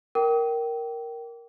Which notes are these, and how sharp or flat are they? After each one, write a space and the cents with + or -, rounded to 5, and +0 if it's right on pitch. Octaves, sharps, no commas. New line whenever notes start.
A#4 +0 G5 -20 D6 -30